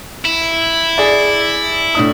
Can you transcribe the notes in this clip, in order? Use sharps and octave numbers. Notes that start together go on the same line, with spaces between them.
E4
G#4 D5
A2 D4 D#6